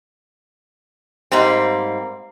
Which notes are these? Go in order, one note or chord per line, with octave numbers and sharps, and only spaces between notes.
G#2 G3 A#3 C4